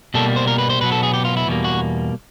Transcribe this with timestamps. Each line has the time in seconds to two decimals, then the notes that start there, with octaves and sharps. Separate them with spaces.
0.14 B2 G3 A#3 A4
0.36 C5
0.47 A#4
0.58 B4
0.70 C5
0.81 B2 F#3 B3 B4
0.92 A4
1.03 G#4
1.14 G4
1.25 F4
1.37 E4
1.47 E2 B2 G3 A#3
1.64 F#4